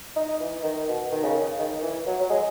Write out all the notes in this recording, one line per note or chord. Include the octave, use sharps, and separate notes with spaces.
D#4
E3
D#3
B2
D#3
C#3
D#3
E3
F#3
F#3
G#3